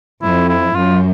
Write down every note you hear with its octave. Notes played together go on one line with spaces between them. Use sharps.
F2 E4
E4
F#2 F4